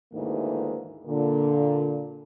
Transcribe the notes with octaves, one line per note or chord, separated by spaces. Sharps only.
D2 G#2 D#3 E3 A#3
A#2 D3